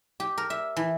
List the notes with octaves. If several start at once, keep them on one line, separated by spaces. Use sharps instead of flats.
G4
A#4
E5
E3